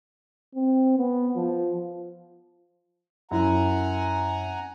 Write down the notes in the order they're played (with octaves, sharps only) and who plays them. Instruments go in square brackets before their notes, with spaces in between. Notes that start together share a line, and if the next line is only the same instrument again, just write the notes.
[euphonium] C4
B3
F3
[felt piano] F#2 E4 [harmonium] F#5 G#5 A#5